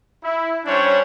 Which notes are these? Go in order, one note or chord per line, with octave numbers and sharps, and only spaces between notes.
E4
G3 C#4 D4 C5 C#5